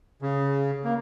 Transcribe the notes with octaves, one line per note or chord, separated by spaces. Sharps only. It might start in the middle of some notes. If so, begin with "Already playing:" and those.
C#3
A#3